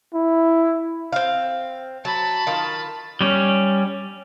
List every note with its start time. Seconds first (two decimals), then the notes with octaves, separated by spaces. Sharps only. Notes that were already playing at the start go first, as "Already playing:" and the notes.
0.14 E4
1.12 C4 F5
2.05 F#3 A5 B5
2.47 D#3 F4
3.21 G3 C#4